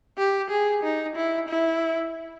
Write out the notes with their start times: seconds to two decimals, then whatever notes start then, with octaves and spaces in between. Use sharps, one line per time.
0.18 G4
0.50 G#4
0.83 D#4
1.16 E4
1.49 E4